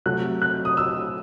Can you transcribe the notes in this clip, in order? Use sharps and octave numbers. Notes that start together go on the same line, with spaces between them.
C3 F#3 A3 F#6
F#6
D#6
E6